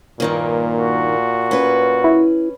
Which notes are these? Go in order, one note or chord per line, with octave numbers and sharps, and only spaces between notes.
G2 A#2 D#3 A#3
F#4
C#4 B4
E4